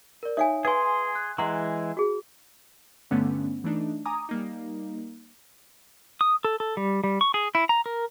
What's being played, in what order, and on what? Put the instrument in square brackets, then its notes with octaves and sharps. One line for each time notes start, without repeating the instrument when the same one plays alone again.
[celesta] A#4 D5
[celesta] D#4 C#5 D#6 [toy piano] E5 F5 G#5
[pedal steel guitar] G#4 C6 [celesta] B4 G#5 [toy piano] F5
[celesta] F#6
[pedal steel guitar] E3 G#3 [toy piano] F#5 A#5 C6
[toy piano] F#4 G#4
[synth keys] G2 D3 A3 B3 C#4
E3 A3 D4 D#4
G#5 A#5 D6 D#6
G3 A#3 D#4
[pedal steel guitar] D#6
A4
A4
G3
G3
C#6
G#4
E4
A#5
A#4